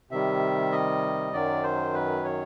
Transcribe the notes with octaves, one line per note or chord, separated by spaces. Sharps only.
C3 D#3 G3 E5
D#5
F#2 D#3 F#3 D5
C5
B4
C#5